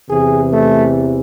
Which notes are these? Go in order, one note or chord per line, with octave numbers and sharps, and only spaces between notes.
E2 C3 E3 G#4
A3